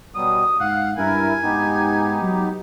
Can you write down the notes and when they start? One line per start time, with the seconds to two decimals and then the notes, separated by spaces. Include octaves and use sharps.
0.15 B2 F#3 G3 D#6
0.60 G#2 F5 F#5
0.98 G2 E4 A#4 G#5
1.43 G#2 B3 D#4 G4
2.22 F#3